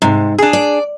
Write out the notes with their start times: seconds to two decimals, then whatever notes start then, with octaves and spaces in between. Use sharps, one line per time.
0.02 G#2 C3
0.38 D4 G#4
0.53 D5